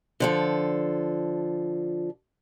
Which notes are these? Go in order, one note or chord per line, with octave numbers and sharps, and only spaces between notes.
D3 F3 A4